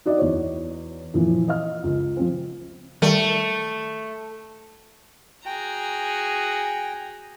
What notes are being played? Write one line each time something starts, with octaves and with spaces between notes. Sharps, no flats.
D#4 F#4 D5 D#5
E2 C#5
A#2 E3 F3
D#5 F5 F6
C#2
F3 C4
D#3 G3 A3
F#4 G#4 G5 A#5